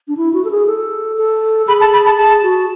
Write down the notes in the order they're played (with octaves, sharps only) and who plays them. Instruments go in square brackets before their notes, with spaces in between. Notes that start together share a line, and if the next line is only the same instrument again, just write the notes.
[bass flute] D4
E4
F#4
A4
G#4
A4
A4
[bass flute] G#4 [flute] B5
[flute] A5
B5
A5
[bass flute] G#4 [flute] A5
[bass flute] F#4